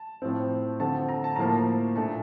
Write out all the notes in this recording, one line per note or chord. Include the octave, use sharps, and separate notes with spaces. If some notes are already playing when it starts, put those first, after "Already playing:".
Already playing: A5
A2 F3 C4
D3 F3 C4 A5
A5
A#5
A5
A2 F3 A#3 A#5
A5
A#2 A3 D4 A5